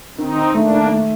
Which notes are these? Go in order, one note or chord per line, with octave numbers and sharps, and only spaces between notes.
D#3 C4 D#4
D#3
A3 A#3 D4
D#3
A3